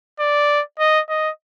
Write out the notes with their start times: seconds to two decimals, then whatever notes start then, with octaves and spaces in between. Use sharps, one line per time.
0.20 D5
0.80 D#5
1.10 D#5